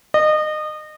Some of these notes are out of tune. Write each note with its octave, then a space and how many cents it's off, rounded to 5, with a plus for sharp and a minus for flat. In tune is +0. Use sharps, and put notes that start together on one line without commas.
D#5 -25